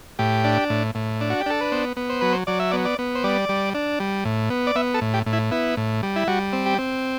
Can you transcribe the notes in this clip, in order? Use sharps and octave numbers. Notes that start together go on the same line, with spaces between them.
A2 G4
D4
A2
A2
D4
F#4
G4
D4 A4
B4
B3 C5
B3
C5
F#3 B4
C5
F#3 D5
E5
B3 D5
D5
B3
C5
G3 D5
G3
D4
G3
A2
B3
D5
B3 E5
A4
A2
G4
A2
E4
B3 E4
A2
G3
E4
G3 F#4
C4
G4
C4